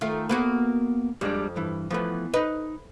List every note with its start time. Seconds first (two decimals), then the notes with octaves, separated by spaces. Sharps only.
0.01 D#3 A3 F4
0.29 A#3 B3 F#4 B4
1.21 F2 G3 G#3 D4
1.56 G2 E3
1.91 E3 F3 A3 B3 B4
2.34 D#4 B4 D#5